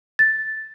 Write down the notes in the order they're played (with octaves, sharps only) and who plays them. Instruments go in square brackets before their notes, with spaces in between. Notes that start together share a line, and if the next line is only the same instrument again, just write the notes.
[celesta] A6